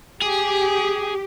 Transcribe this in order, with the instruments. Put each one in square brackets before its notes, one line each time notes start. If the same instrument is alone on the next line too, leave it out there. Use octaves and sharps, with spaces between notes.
[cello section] G4 [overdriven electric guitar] G#4